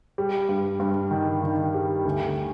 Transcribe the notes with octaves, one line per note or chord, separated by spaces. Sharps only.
G3
G2
G2
D#3
D#3
G3
D2